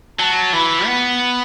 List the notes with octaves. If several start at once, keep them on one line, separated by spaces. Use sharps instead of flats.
F#3 A5
E3 B5
B3